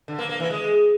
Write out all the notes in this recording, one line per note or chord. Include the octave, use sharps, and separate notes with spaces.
D3
A#3
A#3
E3
G#3